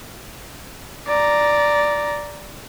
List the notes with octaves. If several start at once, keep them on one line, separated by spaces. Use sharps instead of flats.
D5 A#5